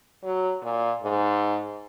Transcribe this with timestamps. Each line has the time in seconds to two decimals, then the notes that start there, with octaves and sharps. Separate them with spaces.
0.24 F#3
0.63 A#2
1.03 G#2